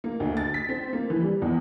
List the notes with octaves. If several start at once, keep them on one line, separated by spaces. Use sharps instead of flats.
A#3
D2
A6
B6
C4
A#3
E3
G3
E2